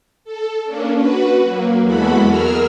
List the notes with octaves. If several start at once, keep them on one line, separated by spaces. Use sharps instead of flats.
A4
A#3 C#4 D4
F#4 B4
F#3 A#3
E2 E3 G#3 F#4 A4 B5
G#4 A#4 E6 F6